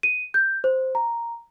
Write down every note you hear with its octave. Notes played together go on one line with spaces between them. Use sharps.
D#7
G6
C5
A#5